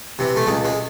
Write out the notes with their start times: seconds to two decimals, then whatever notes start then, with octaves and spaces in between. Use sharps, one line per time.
0.19 C3 E3
0.36 A3
0.47 C#2 G#3
0.65 G#3